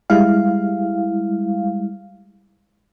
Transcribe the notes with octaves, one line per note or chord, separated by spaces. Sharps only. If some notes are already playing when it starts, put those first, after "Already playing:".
G3 G#3 E4 F5